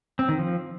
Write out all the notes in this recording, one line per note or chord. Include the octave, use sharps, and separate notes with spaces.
C4
D#3
F3